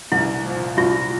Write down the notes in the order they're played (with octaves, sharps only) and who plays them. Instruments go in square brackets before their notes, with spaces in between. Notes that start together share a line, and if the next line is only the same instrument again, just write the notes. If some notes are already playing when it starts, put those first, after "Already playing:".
[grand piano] C2 [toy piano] E4
[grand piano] A#2 F3
[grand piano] C2 [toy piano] F4